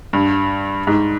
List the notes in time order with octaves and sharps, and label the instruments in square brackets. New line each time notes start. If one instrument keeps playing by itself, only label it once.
[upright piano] G2
G#2